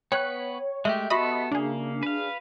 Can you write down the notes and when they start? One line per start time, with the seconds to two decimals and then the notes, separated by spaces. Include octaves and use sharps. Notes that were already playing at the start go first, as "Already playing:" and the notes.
0.12 B3 B4 C#5 G5 F#6
0.85 G#3 A3 G4 E5
1.10 B3 F#4 G4 A4 D#5 E5 B5
1.51 C#3 A#3 D4 G#4
2.03 B4 F5